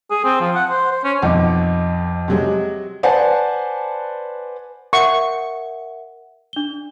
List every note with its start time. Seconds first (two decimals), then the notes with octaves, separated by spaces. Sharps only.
0.11 G#4
0.25 C4
0.41 F3
0.55 F#5
0.70 C5
0.92 C5
1.04 C#4
1.22 B1 F2 D#5 D6
2.28 C3 F#3 G#3
3.03 B4 C5 D5 F#5 G#5 A5
4.93 A#4 E5 F#5 C#6
6.53 D4 G7